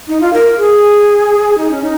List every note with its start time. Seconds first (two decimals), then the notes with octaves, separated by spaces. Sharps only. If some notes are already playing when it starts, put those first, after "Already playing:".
0.08 D#4
0.21 F4
0.33 A#4
0.57 G#4
1.58 D#4
1.71 C#4
1.83 D#4